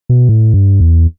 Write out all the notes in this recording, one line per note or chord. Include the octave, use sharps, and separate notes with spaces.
B2
A2
G2
E2